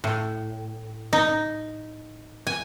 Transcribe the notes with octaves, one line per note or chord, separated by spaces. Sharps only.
A2
D#4
G#5